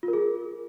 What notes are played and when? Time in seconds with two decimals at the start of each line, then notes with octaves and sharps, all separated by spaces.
0.03 F4
0.08 A#4
0.13 G#4